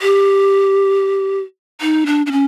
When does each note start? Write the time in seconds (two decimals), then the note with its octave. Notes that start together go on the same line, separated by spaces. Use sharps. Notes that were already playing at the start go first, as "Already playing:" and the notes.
0.02 G4
1.81 D#4
2.06 D4
2.26 D4
2.32 C#4